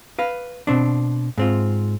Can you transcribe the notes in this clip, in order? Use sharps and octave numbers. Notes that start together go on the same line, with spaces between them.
B4 F5
B2 C4 D4
G#2 C4 F4